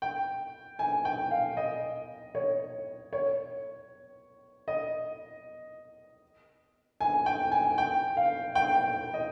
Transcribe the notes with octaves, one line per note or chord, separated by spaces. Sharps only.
G5
G#5
G5
F5
D#5
C#5
C#5
D#5
G#5
G5
G#5
G5
F5
G5
G5
D#5